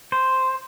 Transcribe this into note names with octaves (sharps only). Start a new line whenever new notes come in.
C5